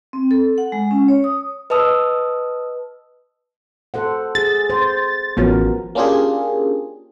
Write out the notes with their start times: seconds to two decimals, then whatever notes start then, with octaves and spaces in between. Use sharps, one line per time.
0.13 C4
0.31 A4
0.58 F#5
0.72 G#3
0.91 C#4
1.08 C#5
1.24 D#6
1.70 B4 D#5 A5 D#6 E6
3.94 A4 C5 F#5
4.35 G#4 A6
4.70 C5
5.37 A1 F3 B3 C#4 F#4 A#4
5.95 A#3 C#4 D4 F4 G4 G#4